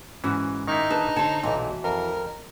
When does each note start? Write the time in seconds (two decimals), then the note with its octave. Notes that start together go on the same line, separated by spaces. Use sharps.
0.24 G#2 E3 C#4 F#4
0.68 D#3 A#3 D#4 E4
0.90 D4 G#4 B4 A5
1.16 D3 C5 C#5 A5
1.43 B1 A#2 E3 F#4
1.84 F2 A#4